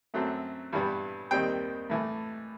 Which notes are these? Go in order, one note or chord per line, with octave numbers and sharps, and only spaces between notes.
F#2 F#3 A3 C4
G2 E3 G3 B3
D#2 D#3 G3 C4 G5
A2 E3 A3